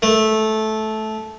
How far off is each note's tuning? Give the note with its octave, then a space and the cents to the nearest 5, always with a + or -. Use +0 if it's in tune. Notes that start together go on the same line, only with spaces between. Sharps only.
A3 -15